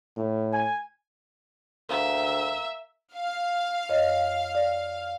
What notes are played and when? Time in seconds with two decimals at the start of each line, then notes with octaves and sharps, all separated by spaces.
0.17 A2
0.53 G#5
1.89 D2 A#4 E5 F5 A#5
3.14 F5
3.89 F2 C#5 D#5
4.55 D5